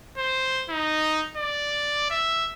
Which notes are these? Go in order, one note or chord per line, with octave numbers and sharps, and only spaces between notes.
C5
D#4
D5
E5